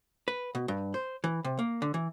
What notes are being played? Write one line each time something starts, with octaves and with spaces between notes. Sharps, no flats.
B4
B2
G2
C5
E3
C3
A#3
D3
E3